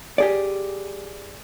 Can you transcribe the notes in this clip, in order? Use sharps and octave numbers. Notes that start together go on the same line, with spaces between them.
G4 G#4 D5